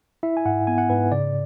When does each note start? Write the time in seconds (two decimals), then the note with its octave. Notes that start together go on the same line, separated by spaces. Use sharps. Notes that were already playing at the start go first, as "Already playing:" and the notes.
0.23 E4 E5
0.37 G#5
0.45 G#2 F#5
0.67 B3 G#5
0.78 F#5
0.90 G#2 B4
1.12 C#3 D5